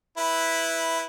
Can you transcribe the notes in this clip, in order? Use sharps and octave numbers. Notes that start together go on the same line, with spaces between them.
E4 B4